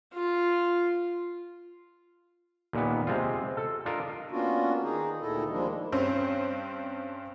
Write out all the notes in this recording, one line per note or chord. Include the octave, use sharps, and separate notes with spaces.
F4
D#2 A#2 A#3 B3
C3 G#3 C4 F4
A4
D4 F4 A4 A#4 D#5
A#3 B3 C#4 D4 F4 F#4
D#3 D#4 G#4
D2 A#2 D#3 E4 A4 D#5
D#3 F3 G3 G#3 A#3 D4
G2 C4 C#4